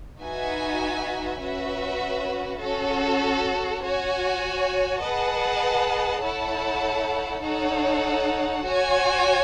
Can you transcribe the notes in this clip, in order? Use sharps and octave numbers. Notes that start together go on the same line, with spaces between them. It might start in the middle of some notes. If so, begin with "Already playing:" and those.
D#4 F#4 B4 E5 G#5
C#4 F#4 B4 E5
C#4 F#4 A4
F#4 C#5 G#5
G#4 B4 D#5 F#5 A5
E4 A4 C#5 F#5 A5
D#4 A4 C#5 F#5
F#4 C#5 G#5